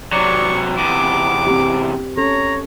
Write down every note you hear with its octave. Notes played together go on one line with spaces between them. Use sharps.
C3 F#3 D5 C#6
E2 C3 B3 D6
C4 G4
C#4 A4 C#5 A#5